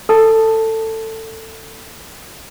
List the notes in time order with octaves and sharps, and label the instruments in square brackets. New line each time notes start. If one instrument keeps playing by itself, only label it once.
[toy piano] A4 A5